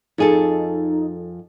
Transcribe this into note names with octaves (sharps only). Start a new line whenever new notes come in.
F2 D#4 G#4 A4